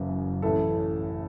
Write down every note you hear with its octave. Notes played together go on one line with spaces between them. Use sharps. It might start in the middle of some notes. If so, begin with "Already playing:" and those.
Already playing: F#1 F#2 E3
A1 A2 E3 A4